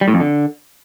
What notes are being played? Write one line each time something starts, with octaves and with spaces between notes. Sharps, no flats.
G3
A2
F2
D3